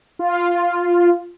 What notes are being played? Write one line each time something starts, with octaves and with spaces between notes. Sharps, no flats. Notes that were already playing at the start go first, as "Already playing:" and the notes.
F4